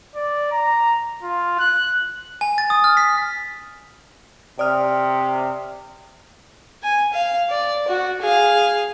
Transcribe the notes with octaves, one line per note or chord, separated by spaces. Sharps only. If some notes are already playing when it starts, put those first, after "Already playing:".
D5
A#5
F4
F#6
G#5
A6
D#6
F6
B6
C3 D5 D#6 F6
G#5
F5
D5
F#4
G#4 F5